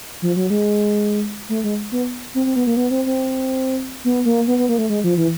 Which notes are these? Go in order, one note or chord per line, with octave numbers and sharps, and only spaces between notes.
F3
F#3
G#3
A3
G#3
B3
C4
C4
B3
A#3
B3
C4
C4
B3
A#3
B3
B3
A#3
A3
G#3
F3
E3